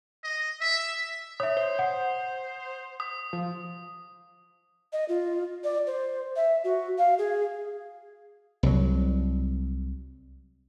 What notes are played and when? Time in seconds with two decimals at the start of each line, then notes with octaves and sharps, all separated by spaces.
0.24 D#5
0.61 E5
1.40 C#5 E5 D#6
1.57 C5
1.79 F#5
3.00 D#6
3.33 F3
4.93 D#5
5.09 F4
5.64 D5
5.87 C5
6.36 E5
6.64 F#4
6.98 F5
7.18 G#4
8.63 C2 F#3